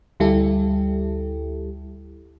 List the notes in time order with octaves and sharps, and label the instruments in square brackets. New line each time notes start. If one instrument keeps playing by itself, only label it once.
[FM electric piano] D2 G3 E4 G4 A4